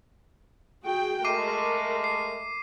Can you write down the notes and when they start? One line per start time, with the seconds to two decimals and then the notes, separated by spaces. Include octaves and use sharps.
0.85 F#4 G#4 G5
1.25 G#3 A3 A#4 D6 C7 D#7
2.04 C7